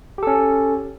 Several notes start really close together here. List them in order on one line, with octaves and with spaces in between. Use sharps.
G4 A4 C#4